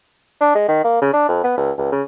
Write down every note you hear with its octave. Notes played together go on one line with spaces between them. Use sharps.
D4
G#3
D#3
A#3
C#3
D4
F2
B3
C#2
C#2
C#3